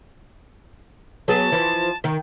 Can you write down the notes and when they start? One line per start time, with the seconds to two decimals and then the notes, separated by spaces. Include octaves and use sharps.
1.28 F#3 B3 G#4 A5
1.52 E3 F3
2.04 D#3